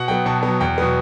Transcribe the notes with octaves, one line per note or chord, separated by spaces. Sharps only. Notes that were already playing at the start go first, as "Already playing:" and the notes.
Already playing: B2 F#5
F#3 B3 G5
B2 A5
F#3 B3
E2 G5
B2 F#3 B3